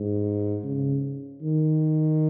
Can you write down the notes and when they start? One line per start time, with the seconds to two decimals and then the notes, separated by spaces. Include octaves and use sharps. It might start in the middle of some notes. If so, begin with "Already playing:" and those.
Already playing: G#2
0.64 C#3
1.42 D#3